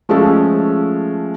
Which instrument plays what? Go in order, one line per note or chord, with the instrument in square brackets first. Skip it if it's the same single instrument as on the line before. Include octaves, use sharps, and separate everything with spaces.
[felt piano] F3 G#3 A3 C#4 A4